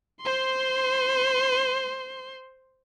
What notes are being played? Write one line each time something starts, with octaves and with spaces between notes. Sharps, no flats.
C5 C6